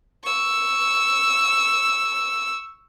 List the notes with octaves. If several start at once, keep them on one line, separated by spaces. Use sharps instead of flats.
C#6 E6